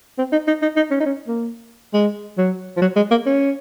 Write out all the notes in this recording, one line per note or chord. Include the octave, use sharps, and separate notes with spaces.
C4
D#4
D#4
D#4
D#4
C#4
D#4
C#4
A#3
G#3
F#3
F3
F#3
G#3
A#3
C#4